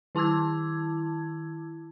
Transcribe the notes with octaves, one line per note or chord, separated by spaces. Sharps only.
D#3 E4 A5 D6 E6 G#6